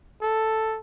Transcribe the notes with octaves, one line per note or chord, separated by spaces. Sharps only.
A4